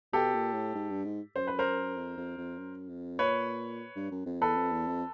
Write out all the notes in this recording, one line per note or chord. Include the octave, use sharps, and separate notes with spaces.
B2 G4 A4
A#2
A2
G#2
G2
G#2
F#2 C5
B4
A#4 C5
F2
F2
F2
F#2
F2
A#2 B4 C#5
G2
F#2
F2
E2 A4 B4
F2
E2
F2